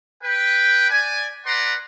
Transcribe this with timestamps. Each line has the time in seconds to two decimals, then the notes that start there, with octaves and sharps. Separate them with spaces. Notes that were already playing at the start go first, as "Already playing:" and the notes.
0.23 B4 G5
0.90 D5 G#5
1.46 B4 D5 F#5 A#5 C6